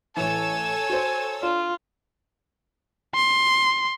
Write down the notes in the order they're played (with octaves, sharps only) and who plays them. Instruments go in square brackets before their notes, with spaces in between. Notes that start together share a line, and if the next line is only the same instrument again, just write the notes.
[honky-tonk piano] A1 E3 [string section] A4 C#5 E6 [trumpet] G#5
[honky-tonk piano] F#4 C5
[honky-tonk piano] D4 [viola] F4
[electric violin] C6